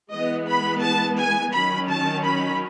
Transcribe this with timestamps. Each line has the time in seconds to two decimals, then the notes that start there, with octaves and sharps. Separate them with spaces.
0.11 E3 G#3 B3 D#5
0.47 B5
0.82 A5
1.19 G#5
1.54 D#3 F#3 C#4 B5
1.90 A5
2.26 B5